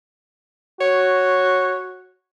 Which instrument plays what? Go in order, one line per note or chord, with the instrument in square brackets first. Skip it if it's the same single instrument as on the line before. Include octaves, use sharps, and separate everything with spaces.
[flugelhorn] F#4 [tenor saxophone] C#5